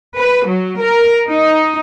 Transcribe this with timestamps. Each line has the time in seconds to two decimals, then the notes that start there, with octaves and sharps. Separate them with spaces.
0.17 B4
0.47 F#3
0.80 A#4
1.28 D#4